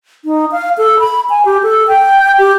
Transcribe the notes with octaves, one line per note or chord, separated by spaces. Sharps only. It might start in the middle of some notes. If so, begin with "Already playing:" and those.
D#4
F5
A4
B5
G#5
G4
A4
G5
G4